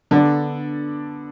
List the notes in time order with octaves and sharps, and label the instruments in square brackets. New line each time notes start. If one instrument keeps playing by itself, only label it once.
[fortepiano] D3 [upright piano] B3 D4 A4 D5